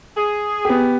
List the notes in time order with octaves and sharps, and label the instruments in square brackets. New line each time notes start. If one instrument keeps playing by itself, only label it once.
[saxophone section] G#4
[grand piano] B3 G4